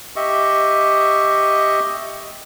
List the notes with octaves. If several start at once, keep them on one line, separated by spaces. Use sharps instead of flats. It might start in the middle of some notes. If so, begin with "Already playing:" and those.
G4 D#5 E5 C#6